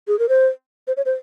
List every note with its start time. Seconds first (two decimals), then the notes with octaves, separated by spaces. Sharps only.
0.08 G#4
0.19 A#4
0.29 C5
0.87 C5
0.97 C#5
1.05 C5